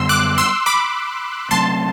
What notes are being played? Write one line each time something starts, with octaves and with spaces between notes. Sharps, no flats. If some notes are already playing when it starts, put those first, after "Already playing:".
Already playing: F#2 D3 G3 B3 C6 E6
D6 F#6
C6 E6
B5 D6
C3 F#3 A3 C4 A5 C6